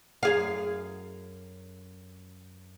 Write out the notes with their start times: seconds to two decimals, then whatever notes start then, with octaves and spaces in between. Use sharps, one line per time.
0.23 F#2 G#4 F5